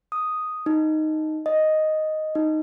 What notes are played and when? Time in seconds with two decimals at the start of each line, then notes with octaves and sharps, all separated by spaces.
0.12 D#6
0.66 D#4
1.46 D#5
2.35 D#4